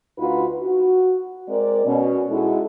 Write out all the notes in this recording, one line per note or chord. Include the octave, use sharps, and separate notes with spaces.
D2 D#4 F4 F#4 B4
F#4
G#3 C4 A#4 D5
B2 C#4
G#3 D#4 E4 F#4 G#4 A4